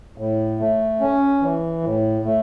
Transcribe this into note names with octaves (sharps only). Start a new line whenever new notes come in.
A2
A3
C#4
E3
A2
A3